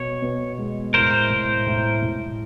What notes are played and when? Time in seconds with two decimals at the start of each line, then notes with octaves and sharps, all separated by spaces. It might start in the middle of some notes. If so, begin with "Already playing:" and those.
Already playing: B2 B3 C#5
0.22 B2
0.58 G#3
0.94 A2 A#4 C5
1.30 A2
1.66 A2
2.02 A2